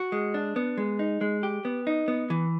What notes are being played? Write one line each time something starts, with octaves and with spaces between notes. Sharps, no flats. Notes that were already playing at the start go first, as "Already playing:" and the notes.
Already playing: F#4
G#3
D4
B3
G#3
D#4
G#3
G4
B3
D#4
B3
E3